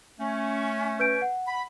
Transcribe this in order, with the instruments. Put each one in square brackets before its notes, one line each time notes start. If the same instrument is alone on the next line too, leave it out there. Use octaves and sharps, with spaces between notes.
[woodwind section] A3 C#4
[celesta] B4 G6 D7
F#5
[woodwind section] B5